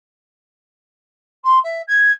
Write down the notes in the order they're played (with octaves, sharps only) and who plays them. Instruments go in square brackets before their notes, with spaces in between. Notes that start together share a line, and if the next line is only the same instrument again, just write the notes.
[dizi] C6
E5
G#6